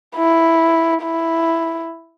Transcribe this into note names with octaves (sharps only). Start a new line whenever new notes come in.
E4
E4